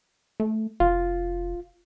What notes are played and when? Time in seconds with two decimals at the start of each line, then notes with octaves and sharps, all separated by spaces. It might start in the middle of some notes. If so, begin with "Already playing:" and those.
0.40 A3
0.80 F1 F4